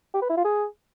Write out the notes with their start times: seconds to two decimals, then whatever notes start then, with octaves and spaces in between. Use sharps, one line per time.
0.14 G4
0.22 B4
0.29 E4
0.37 F4
0.45 G#4